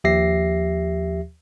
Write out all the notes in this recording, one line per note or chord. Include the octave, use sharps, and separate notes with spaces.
D#2 F3 G4 E5 A#6 C7